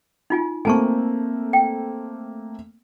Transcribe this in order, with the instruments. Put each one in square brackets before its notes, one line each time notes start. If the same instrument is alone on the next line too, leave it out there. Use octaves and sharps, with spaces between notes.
[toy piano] D#4 F4 G#5
[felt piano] A3 A#3 C4 [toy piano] G#5 A5 C#6
[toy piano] G5